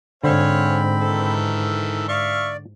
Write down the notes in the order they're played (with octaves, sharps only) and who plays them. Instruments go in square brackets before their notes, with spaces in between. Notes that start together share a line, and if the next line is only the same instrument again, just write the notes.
[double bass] G#2 [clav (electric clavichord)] D3 C5 [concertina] C4 B5 [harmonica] C#5 F5 G#5
[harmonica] D#3 E3 A4
[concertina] D5 [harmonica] E5 F5 C#6